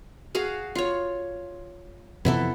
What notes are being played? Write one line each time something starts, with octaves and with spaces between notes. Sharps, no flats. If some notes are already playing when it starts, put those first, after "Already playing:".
F#4 G#4 F5
F4 C#5
F2 C3 E3 B3 E4 A4